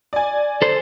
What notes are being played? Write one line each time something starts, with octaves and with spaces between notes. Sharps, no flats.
D5 G#5
A4 C5